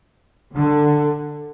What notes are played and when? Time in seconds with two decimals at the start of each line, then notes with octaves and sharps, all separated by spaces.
0.56 D3